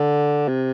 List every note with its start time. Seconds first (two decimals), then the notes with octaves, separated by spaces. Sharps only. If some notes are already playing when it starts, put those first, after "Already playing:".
Already playing: D3
0.48 C3